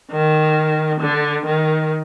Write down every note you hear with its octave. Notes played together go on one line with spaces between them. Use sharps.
D#3
D3
D#3